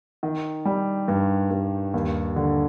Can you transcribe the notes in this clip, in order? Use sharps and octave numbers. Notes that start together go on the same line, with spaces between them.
D#3
G3
G2
G2
D#2
D3